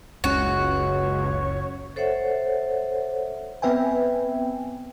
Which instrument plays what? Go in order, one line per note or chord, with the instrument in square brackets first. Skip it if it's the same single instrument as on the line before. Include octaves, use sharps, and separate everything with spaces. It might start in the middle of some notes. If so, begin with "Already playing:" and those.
[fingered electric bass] F#1 C#4 [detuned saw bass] C#2 [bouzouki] F#4 [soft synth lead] C#5
[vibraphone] A4 C5 C#5 E5 F#5
[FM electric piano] B3 C4 B4 E5 G5 G#5